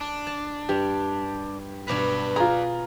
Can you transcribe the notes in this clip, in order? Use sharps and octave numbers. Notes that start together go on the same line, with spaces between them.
D4
A5
G2 G4
G2 B2 B4 D5 A#5
F4 G#4 A#5